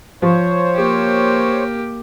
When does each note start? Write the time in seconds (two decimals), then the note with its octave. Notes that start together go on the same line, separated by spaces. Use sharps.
0.22 F3 C5 C#5
0.75 A#3 G4